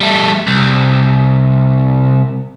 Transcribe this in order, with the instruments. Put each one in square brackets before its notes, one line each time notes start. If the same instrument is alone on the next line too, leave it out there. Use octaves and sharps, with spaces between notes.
[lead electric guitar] G3 A3
C2